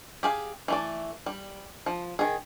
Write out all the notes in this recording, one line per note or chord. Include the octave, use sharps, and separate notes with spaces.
G4 G#4 F5
E3 A3 D5
G3
F3
D#3 G#4